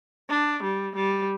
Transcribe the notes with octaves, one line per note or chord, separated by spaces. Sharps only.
D4
G3
G3